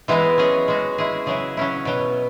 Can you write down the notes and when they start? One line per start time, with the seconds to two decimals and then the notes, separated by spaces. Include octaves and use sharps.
0.08 E3 G#3 B3 E4
0.38 F#3 C#4 G#4
0.68 G#3 C#4 F#4
0.98 G#3 E4 G#4
1.26 C#3 F#3 E4 G#4
1.57 F#3 C#4 E4
1.85 B2 F#3 B3